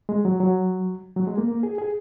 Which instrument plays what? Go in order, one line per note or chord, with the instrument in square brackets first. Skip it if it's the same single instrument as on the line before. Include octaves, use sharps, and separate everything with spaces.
[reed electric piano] G#3
F#3
F#3
F#3
G#3
A#3
A#3
G#4
G#4